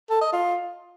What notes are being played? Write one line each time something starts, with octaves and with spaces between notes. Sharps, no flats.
A4
D#5
F4